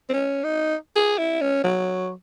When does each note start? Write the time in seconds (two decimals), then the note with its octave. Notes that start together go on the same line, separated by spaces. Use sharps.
0.10 C4
0.14 C#4
0.44 D#4
0.96 G#4
1.18 E4
1.41 C#4
1.64 F#3